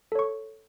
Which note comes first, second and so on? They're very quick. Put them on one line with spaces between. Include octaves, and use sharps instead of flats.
A4 C#5 C#6